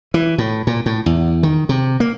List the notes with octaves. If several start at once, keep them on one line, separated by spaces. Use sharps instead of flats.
E3
A2
A#2
A2
E2
D#3
C3
A#3